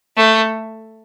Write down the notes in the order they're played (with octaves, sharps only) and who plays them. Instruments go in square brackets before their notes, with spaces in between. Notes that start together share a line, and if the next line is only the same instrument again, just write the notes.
[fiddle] A3